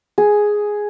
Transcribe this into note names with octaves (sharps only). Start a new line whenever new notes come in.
G#4